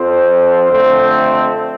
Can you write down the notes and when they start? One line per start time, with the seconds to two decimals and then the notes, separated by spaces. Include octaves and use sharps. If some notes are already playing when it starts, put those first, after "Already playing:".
Already playing: F2 F3 C4 C5
0.68 F2 D3 A3 C4